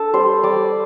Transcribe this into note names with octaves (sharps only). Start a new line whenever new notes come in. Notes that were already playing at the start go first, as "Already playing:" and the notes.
Already playing: D4 A4
G3 C5
G3 D5